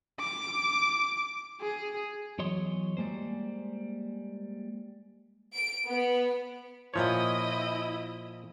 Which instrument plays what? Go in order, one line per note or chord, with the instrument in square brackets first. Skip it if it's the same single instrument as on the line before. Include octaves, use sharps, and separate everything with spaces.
[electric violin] D6
G#4
[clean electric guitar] E2 F#3 C#5 D#5 C6
G3 G#3 A#3 C5
[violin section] D7
B3
[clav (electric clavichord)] A#2 F3 C#5 [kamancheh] E4 D#5